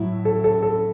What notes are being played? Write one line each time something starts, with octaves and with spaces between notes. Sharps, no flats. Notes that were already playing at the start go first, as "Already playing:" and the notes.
Already playing: A2 F#3 E4
A4
A4
A4